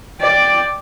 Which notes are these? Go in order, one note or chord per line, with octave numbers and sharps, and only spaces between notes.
D5 G5